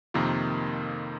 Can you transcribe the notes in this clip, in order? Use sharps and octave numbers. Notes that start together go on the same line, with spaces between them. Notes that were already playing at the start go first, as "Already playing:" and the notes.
F2 C3 D#3 A#3 F4